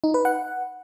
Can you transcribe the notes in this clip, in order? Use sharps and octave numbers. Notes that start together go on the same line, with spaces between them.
D#4
B4
F#5